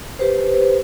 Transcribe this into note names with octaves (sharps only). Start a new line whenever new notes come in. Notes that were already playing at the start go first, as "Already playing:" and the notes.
G4 B4 C5